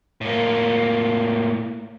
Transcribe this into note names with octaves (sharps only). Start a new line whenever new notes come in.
A2 A#3